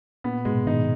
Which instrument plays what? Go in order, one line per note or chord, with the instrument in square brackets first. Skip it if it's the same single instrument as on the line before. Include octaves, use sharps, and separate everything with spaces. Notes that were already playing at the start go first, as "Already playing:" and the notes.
[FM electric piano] A#2 [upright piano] B3
[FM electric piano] G#2 B2 [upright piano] G#3
[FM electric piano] B2 D#3 [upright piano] D#4